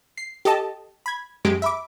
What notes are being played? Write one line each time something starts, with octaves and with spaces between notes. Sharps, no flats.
C7
G4 A4 D#5 A5
B5 G#6
F#2 G#3 G4 D7
E5 B5 D6